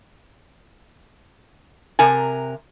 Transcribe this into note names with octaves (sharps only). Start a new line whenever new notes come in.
C3 A#4 G#5